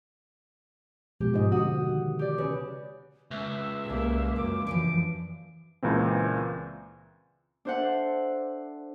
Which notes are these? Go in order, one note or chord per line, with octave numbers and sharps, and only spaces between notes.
B2 F3 G#3 G4
G#2 D#4 D#5
D3 C4 F#4 F#5 D#6
D#3
G4 D5
C#3 B4
C#2 E5
C2 A#3
F#2 A#5 D6
E3 F3 D4 D7
C#2 A#2 E3 C4
D4 A4 C5 E5 F#5